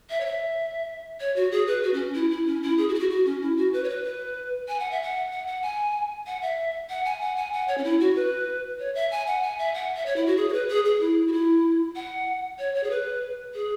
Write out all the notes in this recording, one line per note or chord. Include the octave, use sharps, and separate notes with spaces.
E5
C#5
E5
C#5
F#4
G#4
B4
F#4
C#4
E4
E4
C#4
E4
G#4
F#4
E4
F#4
F#4
C#4
E4
F#4
B4
C#5
B4
B4
G#5
F#5
E5
F#5
F#5
F#5
G#5
F#5
E5
F#5
G#5
F#5
G#5
F#5
C#5
C#4
E4
F#4
B4
C#5
E5
G#5
F#5
G#5
E5
F#5
E5
C#5
E4
F#4
G#4
C#5
B4
G#4
G#4
E4
F#4
E4
F#5
C#5
C#5
G#4
B4
G#4